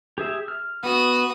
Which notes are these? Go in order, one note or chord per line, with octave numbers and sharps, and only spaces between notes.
G4 G#4 E5
F6
B3 F#4 D#6